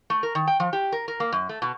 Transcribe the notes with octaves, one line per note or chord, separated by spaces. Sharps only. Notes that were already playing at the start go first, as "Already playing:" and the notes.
A3
A#4
D#3
G5
F3
G4
A#4
A#4
A#3
F#2
A3
B2